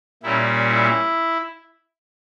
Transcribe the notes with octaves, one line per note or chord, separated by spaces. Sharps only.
A#2 G3 A#3 C#4 E4
E4